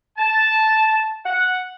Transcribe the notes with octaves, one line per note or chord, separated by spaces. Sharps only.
A5
F#5